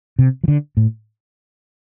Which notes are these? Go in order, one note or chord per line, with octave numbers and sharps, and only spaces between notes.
C3
F3
D3
A2